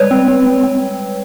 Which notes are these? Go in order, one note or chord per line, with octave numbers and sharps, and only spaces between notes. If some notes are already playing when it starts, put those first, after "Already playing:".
Already playing: G3 G#3 B4 C#5
C4
C4
C4
C4